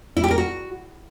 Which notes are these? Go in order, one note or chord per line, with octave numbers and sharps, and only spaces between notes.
E4
G4
A#4
F#4